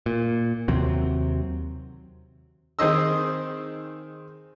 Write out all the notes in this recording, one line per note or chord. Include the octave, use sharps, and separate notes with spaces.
A#2
D#2 C3 F#3 C4
D#3 C4 G#4 C5 D#5 E6